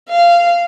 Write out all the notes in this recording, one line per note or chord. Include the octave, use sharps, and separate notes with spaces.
F5